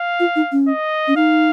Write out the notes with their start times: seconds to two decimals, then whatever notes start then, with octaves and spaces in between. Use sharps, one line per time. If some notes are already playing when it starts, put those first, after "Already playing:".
Already playing: F5
0.20 F4
0.36 D#4
0.52 C#4
0.68 D#5
1.08 C#4
1.16 D#4 F5